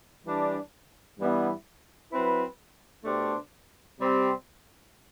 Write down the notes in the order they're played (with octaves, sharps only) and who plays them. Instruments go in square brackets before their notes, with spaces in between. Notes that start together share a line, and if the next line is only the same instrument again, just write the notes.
[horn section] E3 G3 D4
G2 E3 G3 B3 E4
F#3 C4 E4 B4
B2 A3 D4 G4 C5
C3 G3 C4